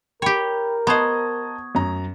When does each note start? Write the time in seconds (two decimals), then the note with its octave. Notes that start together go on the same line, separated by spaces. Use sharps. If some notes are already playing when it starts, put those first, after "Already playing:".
0.22 G4 A#4 C#5 G5 B5
0.87 B3 C5 D#5 A5 A#5 C#6 D#6 G#6
1.75 F#2 A#5